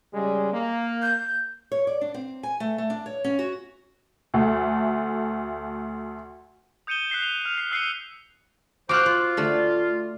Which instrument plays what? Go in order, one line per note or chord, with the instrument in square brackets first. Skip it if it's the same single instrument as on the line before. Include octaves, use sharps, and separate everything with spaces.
[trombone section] C#3 G3 G#3
A#3
[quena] G6
[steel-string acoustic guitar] C#5
D5
D4
C4
G#5
A3
A3
D4
C#5
C#4
F#4
[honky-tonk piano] D2 A3
[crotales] D#6 G6 C#7 D#7 E7 G7
F#6 B6 C7 G7
F7 G7
F6 F7
C7
E6 F#6 C7 C#7 D#7 G7
[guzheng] F4 F#4 [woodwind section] C5 [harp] D6 F6 F#6
[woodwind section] F4 [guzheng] C5
[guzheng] D3 A3